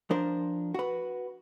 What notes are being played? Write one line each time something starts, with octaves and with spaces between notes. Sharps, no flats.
F3 D4 A#4 C5
F#4 B4